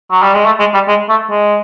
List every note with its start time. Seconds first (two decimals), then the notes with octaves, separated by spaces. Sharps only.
0.11 F#3
0.22 G3
0.34 G#3
0.46 A3
0.59 G#3
0.74 G3
0.88 G#3
1.09 A3
1.30 G#3